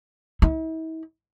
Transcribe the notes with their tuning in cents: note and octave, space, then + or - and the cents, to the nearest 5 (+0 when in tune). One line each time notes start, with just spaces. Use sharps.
E4 -45